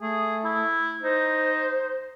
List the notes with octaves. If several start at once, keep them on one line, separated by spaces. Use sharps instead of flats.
A3 G#4
E4
D#4 C5